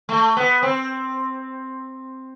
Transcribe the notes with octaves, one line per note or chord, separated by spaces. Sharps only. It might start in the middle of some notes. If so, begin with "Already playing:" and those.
A3
B3
C4